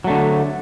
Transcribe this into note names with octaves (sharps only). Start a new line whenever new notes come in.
D3 F#3 A3